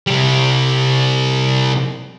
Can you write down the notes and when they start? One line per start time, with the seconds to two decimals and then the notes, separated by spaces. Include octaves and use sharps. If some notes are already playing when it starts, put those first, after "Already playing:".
0.07 C3 G3